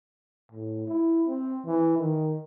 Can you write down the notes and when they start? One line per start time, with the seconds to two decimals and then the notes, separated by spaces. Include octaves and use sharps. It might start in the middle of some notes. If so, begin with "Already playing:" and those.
0.52 A2
0.87 E4
1.27 C4
1.65 E3
1.98 D#3